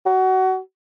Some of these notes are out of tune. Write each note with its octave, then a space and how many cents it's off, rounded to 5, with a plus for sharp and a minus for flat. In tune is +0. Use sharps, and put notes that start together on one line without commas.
F#4 +25